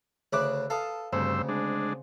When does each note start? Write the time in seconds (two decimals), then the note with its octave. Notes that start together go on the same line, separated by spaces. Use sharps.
0.33 D2 C#3 B4 E5 D6 F#6
0.70 A4 F5 A5 D#6
1.13 D2 G2 C#3 C4 C5 E6
1.49 G#3 D4